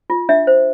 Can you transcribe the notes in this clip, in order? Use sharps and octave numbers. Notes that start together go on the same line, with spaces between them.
F4
D4 E5
C5